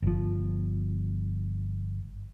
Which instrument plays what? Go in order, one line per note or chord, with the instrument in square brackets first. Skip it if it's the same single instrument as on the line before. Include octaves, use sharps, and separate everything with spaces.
[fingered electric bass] G1 F3